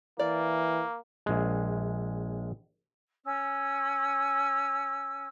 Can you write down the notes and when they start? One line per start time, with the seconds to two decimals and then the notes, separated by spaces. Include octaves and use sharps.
0.19 E3 A#3 D5
1.26 A#1 G#3
3.24 C#4 E6